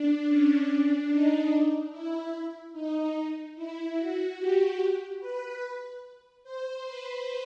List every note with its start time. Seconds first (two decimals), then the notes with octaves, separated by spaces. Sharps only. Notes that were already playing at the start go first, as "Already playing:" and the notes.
Already playing: D4
0.27 C#4
0.67 D4
1.09 D#4
1.90 E4
2.73 D#4
3.55 E4
3.97 F#4
4.38 G4
5.20 B4
6.43 C5
6.85 B4